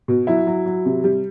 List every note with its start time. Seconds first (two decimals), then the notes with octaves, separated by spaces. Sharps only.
0.08 B2
0.27 F#3 E4
0.47 F#3
0.66 F#3
0.86 C3
1.04 G3